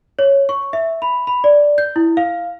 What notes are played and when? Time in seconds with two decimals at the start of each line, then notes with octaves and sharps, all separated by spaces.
0.19 C#5
0.49 C#6
0.73 E5
1.02 B5
1.27 B5
1.44 D5
1.78 G6
1.96 E4
2.17 F5